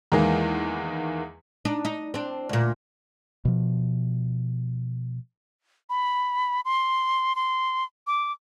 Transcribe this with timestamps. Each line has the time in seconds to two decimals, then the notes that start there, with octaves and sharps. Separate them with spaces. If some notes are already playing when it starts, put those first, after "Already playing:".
0.12 E2 D#3 E3 G#3 A#3
1.65 D4 D#4
1.85 D#4
2.14 C4 D4
2.49 D2 A#2
3.45 B2 F3
5.89 B5
6.65 C6
7.36 C6
8.07 D6